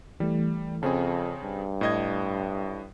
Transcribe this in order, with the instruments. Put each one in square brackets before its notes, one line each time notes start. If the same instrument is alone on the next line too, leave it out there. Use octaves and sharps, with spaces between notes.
[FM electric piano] E3 A3 [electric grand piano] G3
[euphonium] F2 [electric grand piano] C#3 C4 G#4 [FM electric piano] A5
[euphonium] G2
[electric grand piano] A2 D#5 G#6